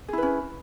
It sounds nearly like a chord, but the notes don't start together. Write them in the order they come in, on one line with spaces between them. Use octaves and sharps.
G#4 E4 B4 C#4